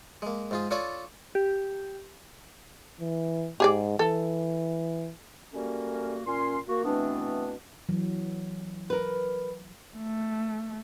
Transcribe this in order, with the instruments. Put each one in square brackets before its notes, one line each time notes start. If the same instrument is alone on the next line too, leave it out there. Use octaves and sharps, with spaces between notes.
[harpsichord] G#3 A#3
G#2 F4 G#4
D4 F4 A4 C#5 D5 G#5
[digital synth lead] G4
[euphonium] E3
[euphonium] G#2 [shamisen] G4 G#4 D5
[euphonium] E3 [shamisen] A4
[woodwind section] G3 A3 A#3 C#4 F#4 A#4
A#2 C#4 C6
A#3 F#4
B2 E3 A3 B3 C4 D4
[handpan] E3 F#3
[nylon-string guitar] A#4 B4
[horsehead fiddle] A3